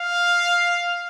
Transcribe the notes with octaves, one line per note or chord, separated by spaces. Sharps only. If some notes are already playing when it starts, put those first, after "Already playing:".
Already playing: F5